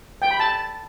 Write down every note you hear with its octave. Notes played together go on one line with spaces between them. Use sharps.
G5
B5
A5